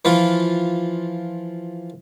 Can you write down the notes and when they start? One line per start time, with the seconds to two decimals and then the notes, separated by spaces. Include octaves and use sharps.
0.05 E3 F3 F4